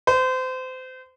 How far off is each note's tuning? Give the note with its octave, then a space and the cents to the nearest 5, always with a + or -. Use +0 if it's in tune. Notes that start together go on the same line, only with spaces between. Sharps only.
C5 -30